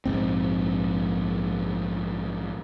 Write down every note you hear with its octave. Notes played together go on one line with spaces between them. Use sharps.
A#1 G#2 C4